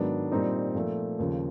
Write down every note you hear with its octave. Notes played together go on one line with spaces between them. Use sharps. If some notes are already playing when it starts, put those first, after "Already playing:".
Already playing: G#2 D#3 F#3 B3 D4
A#2 G3 C4 D#4
A#2 F3 A3
D#2 C#3 F3